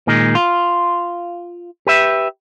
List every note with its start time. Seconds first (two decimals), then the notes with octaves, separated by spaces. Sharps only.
0.07 A#2 D#3 G#3
0.35 F4
1.87 G4 B4 E5